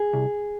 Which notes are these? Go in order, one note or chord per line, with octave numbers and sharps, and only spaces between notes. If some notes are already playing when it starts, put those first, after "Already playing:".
Already playing: G#4
C2